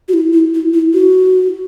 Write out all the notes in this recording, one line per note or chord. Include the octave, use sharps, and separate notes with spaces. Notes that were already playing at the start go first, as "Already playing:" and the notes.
F#4
E4
E4
E4
E4
F#4